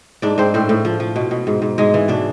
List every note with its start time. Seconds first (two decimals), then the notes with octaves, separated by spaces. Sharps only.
0.22 G#2 D4 D5
0.38 G#2 C4 C5
0.54 A2 C4 C5
0.69 A2
0.85 F3
1.00 F3
1.16 B2
1.31 B2
1.47 G#2
1.62 G#2
1.78 G#2 G#3 G#4
1.94 E3
2.08 B2 D4 D5